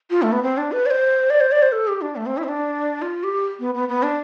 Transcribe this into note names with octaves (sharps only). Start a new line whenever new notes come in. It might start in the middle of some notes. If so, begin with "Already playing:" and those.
F4
A3
B3
C4
D4
B4
D5
C5
D5
C5
D5
C5
A4
G4
D4
A3
C4
E4
C4
D4
F4
G4
B3
B3
B3
D4